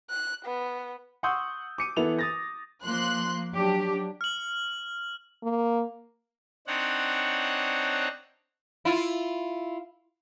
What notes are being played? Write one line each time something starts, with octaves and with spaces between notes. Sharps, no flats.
F#6
B3
F#5 C6 C#6 D#6 E6 G6
D6 C#7 D#7
E3 B3 E4 A4 F7
D#6 A6 A#6
F3 A#3 C6 F#6
F#3 D4 G4
F6 F#7
A#3
C4 D4 D#4 C#5 F#5
E4 F4